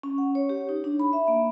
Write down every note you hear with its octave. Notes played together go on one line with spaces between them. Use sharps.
C#4
F#5
C#5
G4
D#4
D4
B5
E5
A#3